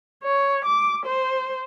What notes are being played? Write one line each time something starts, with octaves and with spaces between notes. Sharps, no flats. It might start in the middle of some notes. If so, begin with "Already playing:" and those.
C#5
D6
C5